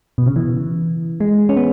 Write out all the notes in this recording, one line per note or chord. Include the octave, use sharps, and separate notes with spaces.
B2
C#3
E3
G#3
C#4
B3